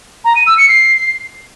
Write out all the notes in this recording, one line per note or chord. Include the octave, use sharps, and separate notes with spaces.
A#5
D#7
E6
C#7
C7